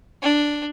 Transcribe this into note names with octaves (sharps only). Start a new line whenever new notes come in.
D4